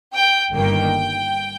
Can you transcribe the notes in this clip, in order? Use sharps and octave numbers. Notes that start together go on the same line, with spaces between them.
G5
G1 G2 D#3 A#3 G5